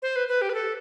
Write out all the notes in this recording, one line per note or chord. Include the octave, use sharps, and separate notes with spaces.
C5
B4
B4
G4
B4
A4